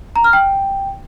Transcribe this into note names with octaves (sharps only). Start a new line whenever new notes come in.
A#5
F6
G5